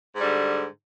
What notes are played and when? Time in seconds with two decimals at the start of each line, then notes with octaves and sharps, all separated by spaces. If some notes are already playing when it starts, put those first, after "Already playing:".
0.15 G#2
0.20 G3
0.24 D3